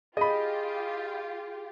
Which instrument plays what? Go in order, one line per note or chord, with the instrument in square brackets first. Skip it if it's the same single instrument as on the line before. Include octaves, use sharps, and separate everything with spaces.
[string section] F4 G4 [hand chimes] G#4 [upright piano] D#5 B5